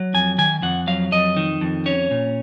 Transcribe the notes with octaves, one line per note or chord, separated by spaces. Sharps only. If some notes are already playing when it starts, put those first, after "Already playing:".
Already playing: F#3
F2 G#5
D#3 G#5
F2 F#5
F#3 F5
F2 D#5
D#3
F2
C#4 C#5
A#2